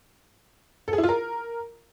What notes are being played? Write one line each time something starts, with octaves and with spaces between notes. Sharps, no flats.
A4
G#4
E4
F4
A#4